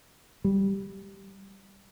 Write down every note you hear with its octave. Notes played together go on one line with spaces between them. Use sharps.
G3